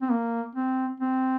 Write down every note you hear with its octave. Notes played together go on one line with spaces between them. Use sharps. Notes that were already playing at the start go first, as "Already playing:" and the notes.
C4
A#3
C4
C4